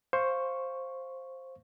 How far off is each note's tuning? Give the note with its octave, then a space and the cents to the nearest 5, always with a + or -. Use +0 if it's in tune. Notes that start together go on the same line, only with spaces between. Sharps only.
C5 +10 F5 +0 C#6 +0